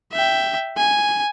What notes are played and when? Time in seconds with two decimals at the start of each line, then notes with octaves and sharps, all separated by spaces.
0.13 E5 G5
0.77 G#5